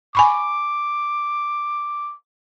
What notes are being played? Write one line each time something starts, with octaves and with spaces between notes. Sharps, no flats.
G#5 B5 C#6 D6